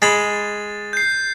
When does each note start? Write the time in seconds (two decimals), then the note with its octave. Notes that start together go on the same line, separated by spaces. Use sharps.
0.02 G#3 B5 A6
0.93 G6 C7